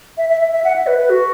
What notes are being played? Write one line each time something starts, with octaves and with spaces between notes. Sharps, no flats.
E5
E5
E5
E5
F#5
E5
B4
B4
F#4